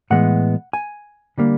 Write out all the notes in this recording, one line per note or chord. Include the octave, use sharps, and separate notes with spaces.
A2 E3 G#3 B3 F#5
G#5
D3 G3 A#3